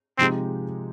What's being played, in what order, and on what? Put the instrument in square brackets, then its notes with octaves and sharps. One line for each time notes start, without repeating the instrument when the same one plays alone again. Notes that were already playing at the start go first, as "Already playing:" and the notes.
[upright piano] C3 F3 G#3 D#4 G4 [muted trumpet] C4